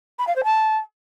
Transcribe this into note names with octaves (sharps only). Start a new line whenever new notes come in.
B5
F5
C5
A5